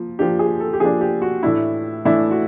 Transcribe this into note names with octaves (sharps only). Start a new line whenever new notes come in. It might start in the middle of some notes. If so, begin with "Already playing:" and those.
Already playing: F3 A#3
F3 A#3 D4 G4
G#4
A4
G4
F3 A#3 D4 G#4
G4
F#4
A2 E3 A3 D4 E4
A2 E3 A3 D4 E4
F#4